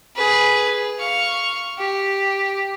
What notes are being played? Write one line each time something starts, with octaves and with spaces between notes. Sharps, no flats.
G#4 B4
F5 C#6
G4